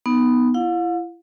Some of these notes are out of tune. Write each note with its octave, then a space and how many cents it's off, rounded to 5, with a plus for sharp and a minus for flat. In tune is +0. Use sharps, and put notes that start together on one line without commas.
B3 +0 D#4 +0
E4 +35 F5 +45